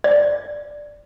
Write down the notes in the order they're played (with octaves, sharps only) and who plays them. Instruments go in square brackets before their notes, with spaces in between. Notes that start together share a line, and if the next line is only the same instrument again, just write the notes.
[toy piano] D5